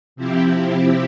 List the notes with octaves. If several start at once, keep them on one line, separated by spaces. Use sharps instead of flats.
C3 F3 C4 E4 G4